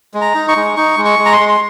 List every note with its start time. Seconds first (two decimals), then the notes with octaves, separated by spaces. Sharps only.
0.14 G#3
0.21 A#5
0.35 D#4
0.48 C#6
0.56 G#3
0.77 D#4 C#6
0.97 G#3
1.05 C#6
1.19 G#3
1.26 A#5
1.33 C6
1.40 G#3
1.49 C6